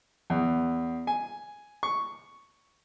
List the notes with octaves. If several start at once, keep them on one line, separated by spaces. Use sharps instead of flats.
E2
G#5
C#6